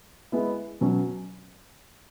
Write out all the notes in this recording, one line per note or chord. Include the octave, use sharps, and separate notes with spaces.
G#3 B3 E4
B2 F#3 C#4